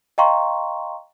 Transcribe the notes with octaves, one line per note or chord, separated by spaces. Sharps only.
D#5 F5 G5 A#5 C6 C#6